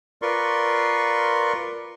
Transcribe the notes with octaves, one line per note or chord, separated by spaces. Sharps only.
F4 A#4 B4 D5 C6 C#6